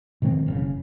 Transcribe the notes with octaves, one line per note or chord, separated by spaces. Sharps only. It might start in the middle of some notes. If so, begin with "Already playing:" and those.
B2 D#3 G#3 C4
F#1 A2 C#3